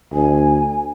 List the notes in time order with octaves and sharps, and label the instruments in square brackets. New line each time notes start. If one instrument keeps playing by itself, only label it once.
[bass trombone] D2 [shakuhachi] G#5